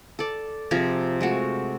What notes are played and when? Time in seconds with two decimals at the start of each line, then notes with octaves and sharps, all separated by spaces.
0.19 A4 D5
0.71 C3 F3 G#4 A#5
1.21 G#3 A3 F#4